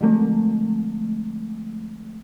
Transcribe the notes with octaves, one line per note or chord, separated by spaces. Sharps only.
D3 F3 G#3 A3 C4